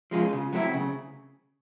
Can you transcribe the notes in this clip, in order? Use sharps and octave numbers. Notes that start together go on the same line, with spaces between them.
F3 G#3 C#4 F4
C#3
F#3 A3 C4 E4
C#3